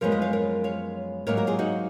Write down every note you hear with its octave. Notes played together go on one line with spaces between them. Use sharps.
F#2 F3 G#3 B3 A#4 C#5
B4 D#5
C#5 F5
A#4 C#5
C#5 F5
G#2 F#3 A#3 A#4 C#5
F#4 A#4
F4 G#4
D#4 F#4